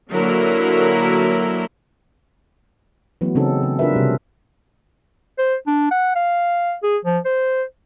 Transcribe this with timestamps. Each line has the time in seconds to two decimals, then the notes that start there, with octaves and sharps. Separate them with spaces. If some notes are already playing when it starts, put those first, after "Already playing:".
0.10 D3 F#3 A#3 E4 A#4
3.21 E3 F#3 A3 B3
3.35 C#3 C4 C#4 D#4 A4
3.63 C#3
3.79 D4 F4 A#4 B4 E5
3.93 C3 G3
5.38 C5
5.67 D4
5.91 F#5
6.15 F5
6.83 G#4
7.05 F3
7.25 C5